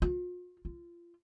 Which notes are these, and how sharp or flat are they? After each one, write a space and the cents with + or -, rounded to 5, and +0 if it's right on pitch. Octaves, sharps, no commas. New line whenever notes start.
F4 +40
F4 -25